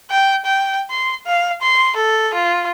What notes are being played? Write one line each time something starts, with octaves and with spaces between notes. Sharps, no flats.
G5
G5
C6
F5
C6
A4
F4